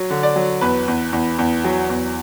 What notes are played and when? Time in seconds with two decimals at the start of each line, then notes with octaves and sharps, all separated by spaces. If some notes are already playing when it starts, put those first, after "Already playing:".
Already playing: F#3
0.10 D3
0.23 D5
0.36 F#3
0.61 E2 B4
0.88 E2
1.13 E2
1.39 E2
1.65 F#3
1.90 E2